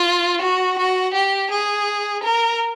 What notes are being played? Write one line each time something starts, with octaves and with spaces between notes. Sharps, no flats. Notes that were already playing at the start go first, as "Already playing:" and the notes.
Already playing: F4
F#4
F#4
G4
G#4
A#4